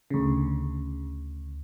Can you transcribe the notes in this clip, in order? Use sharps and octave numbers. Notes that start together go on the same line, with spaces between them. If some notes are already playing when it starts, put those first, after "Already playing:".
D2 C#3